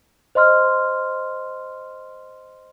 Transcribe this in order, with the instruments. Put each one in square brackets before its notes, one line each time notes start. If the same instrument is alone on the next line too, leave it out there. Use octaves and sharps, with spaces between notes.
[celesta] C5 D#5 C6 F6